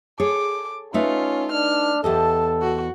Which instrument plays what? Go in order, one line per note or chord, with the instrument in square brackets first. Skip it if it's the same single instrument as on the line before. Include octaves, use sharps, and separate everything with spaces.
[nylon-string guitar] G#4 A4 C#5 [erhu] D6
[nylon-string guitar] A3 D#4 B4 [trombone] C#4 [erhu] F4
[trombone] D4 [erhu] F6
[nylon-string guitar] E2 G4 D#5 [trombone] A4 [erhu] A5
[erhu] F#4